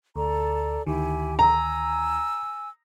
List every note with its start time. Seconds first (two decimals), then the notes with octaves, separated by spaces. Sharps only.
0.16 D2 A4 D5 A#5
0.87 D2 D#3 E4 G4 G#5
1.39 G#5 A#5 E6